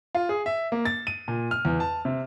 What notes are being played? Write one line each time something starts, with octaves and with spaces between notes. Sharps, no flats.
F4
G#4
E5
A#3
A6
D#7
A#2
F6
E2
A5
C3